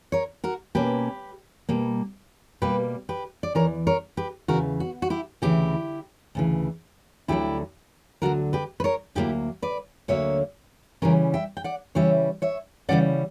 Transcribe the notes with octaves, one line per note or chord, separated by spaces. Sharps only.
A#4 C#5
F#4 A#4
B2 A#3 C#4 G4 B4
B2 G3 A#3
B2 G3 A#3 G4 B4
G4 B4
D5
E2 C#3 E3 A#4 C#5
A#4 C#5
G4 B4
E2 C#3 E3 F#4 A#4
F#4
F#4
E4 G4
D2 C#3 E3 E4 G4
D2 C#3 E3
D2 D3 F#3 E4 G4
D2 D3 F#3 F#4 A#4
G4 B4
B4
A#4 C#5
D2 D3 F#3 A#3 E4 G4
B4 D5
D2 D3 F#3 A#3 C#5 E5
C#3 E3 G3 C#4 A#4 C#5
E5 G5
G5
D5 F#5
C#3 E3 G3 C#4 C#5 E5
C#5 E5
C#3 E3 G3 C#4 D5 F#5